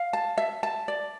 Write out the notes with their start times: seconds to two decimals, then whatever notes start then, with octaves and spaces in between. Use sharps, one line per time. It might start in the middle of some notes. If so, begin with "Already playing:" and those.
Already playing: F5
0.13 A5
0.38 E5
0.63 A5
0.88 D5